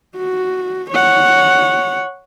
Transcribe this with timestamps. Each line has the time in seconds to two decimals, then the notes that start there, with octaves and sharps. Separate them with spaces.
0.16 F#4
0.91 C#5 F#5